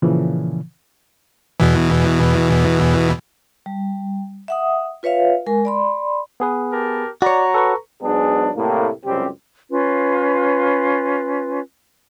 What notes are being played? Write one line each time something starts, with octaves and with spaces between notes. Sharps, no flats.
A#2 C#3 E3 F3
E2 B2 E3
G3
E5 F#5 D#6
F4 B4 C#5 E5 F5
G#3 A#4 G#5
D5 B5 C6
B3 G#4 B4
G4 A#4 A5
F#4 C#5 D5 A#5
A4 B4 C#6
G#2 F#3 B3 D4 G#4
C2 A2 A#3
C#2 F#2 C3 G3 C4 G4
C#4 F4 B4